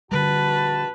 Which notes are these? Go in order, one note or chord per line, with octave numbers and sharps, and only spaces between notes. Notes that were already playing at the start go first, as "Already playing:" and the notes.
A#1 D3 G3 F#4 B4 A5